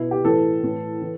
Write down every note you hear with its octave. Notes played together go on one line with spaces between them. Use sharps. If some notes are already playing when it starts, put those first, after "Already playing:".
Already playing: B2 E4
G4
A2 E3 A4
A2 E3
E3